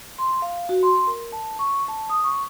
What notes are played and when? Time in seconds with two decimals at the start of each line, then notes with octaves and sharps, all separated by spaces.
0.19 C6
0.42 F5
0.69 F#4
0.83 C6
1.07 A#4
1.32 A5
1.59 C#6
1.88 A5
2.10 D#6
2.24 C#6